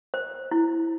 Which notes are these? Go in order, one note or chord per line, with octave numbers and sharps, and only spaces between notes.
C5
E4